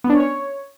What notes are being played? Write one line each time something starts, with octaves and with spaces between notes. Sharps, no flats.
B3
D4
C#4
C#5